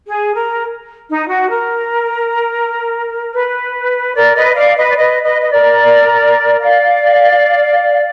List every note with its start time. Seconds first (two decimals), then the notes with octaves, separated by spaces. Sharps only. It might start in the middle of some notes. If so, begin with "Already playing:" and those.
0.07 G#4
0.35 A#4
1.09 D#4
1.29 F#4
1.50 A#4
3.34 B4
4.15 A#4 D5
4.36 B4 D#5
4.55 D5 F5
4.77 B4 D#5
4.89 D5
4.97 B4 D#5
5.24 B4 D#5
5.41 D#5
5.51 A#4 D5
6.60 D5 F5